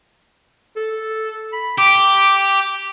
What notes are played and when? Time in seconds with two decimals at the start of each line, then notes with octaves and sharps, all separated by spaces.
0.76 A4
1.53 B5
1.78 G4 D6